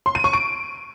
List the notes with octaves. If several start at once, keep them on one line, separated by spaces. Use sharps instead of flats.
C6
D#7
C#6
D7